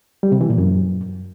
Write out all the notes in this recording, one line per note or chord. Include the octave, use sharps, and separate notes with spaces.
G3
C3
E3
A#2
F#2